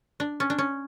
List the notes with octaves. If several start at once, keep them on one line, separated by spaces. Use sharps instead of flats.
D4
C#4
D4
C#4